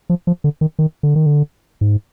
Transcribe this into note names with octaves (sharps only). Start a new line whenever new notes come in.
F3
F3
D3
D#3
D#3
D3
D#3
D3
G#2